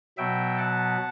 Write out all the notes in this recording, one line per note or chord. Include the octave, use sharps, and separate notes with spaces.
B2 F#3 B3 E5 G5
F#5 A5